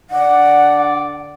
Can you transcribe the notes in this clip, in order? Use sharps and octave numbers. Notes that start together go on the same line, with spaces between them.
D3 D4 D5 F#5